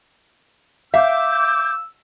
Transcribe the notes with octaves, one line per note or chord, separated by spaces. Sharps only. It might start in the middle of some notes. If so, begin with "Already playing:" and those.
E5 F5 D6 E6 G6